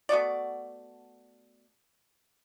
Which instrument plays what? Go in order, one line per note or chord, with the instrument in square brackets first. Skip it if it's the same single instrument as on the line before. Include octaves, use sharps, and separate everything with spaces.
[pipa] A3 B3 F#4 D5